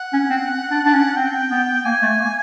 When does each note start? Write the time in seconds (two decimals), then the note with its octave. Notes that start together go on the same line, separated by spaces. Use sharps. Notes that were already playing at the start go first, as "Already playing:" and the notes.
Already playing: F#5
0.13 C#4
0.30 C4
0.71 D4
0.85 D4
0.93 C#4
1.16 C4 G5
1.51 B3
1.85 A#3 G#5
2.02 A3
2.20 A#3